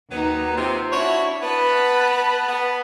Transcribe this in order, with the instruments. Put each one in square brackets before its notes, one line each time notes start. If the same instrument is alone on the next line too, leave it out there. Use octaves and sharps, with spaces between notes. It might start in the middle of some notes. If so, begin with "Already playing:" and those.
[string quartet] D#2 D#4 [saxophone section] F#3 B3
[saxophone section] C3 [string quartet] F4
[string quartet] D4 E4 [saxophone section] F#4 C#5
[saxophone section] B3 [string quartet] B4 A5 B5
[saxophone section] B3